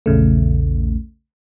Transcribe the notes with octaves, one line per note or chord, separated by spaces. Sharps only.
A#1 E2 C#3 A3